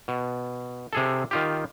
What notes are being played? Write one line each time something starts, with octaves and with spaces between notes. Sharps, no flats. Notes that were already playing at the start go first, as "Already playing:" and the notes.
B2
C3 G#4 A4
D#3 F4 G4